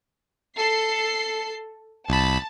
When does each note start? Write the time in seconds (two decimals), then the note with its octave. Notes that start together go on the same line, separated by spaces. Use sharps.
0.56 A4 C7
2.09 C2 A5 B5